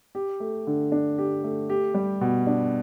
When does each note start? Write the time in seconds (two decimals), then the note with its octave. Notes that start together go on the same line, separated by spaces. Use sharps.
0.15 G4
0.40 A3
0.67 D3
0.92 D4
1.18 G4
1.44 A3
1.70 G4
1.95 G3
2.21 B2
2.47 D4